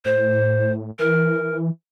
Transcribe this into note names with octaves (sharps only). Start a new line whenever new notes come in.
A2 C5
E3 A#4